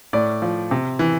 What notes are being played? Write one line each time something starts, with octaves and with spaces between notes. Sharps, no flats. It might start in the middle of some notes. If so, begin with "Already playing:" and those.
A2 D5
F3
C3
E3